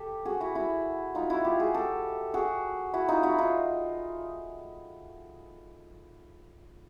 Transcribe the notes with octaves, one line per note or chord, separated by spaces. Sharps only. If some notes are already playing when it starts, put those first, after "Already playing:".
Already playing: G4 A4
F#4 G#4
E4 F#4
E4 F#4
D#4 F4
E4 F#4
F4 G4
F#4 G#4
G4 A4
F#4 G#4
E4 F#4
D#4 F4
E4 F#4
D#4 F4